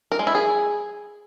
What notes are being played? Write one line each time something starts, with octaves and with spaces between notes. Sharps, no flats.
A#4
G#3
E4
G#4